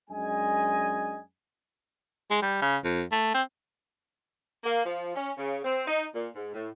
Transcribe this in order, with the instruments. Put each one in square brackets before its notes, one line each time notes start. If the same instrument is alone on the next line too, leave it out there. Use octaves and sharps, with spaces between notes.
[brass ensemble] F#2 G#3 D4 D#5 G#5
[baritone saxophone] G#3
G3
C#3
F2
A3
C4
[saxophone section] A#3
F3
C#4
C#3
C4
D#4
A#2
G#2
A2